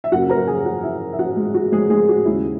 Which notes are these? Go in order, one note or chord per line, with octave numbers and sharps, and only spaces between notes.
E5
F#2 C#3 F#3 A#3 F#4 F#5
A#4 A#5
G#4 G#5
F#4 F#5
E4 E5
E5
F#4 F#5
G#3 G#4
F#4
G#3 G#4
G#3 G#4
F#4
D#2 C#3 G#3 E4